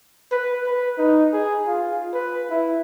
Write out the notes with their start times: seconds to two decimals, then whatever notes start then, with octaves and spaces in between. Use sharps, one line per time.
0.31 B4
0.66 B4
0.98 D#4
1.33 G#4
1.66 F4
2.13 B4
2.50 E4